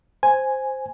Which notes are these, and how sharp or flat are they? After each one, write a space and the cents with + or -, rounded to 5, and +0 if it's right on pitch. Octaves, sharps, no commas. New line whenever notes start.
C5 +0 G#5 +0